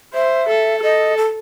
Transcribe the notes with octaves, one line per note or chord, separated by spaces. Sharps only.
C5 E5
A4
A4 D#5
A4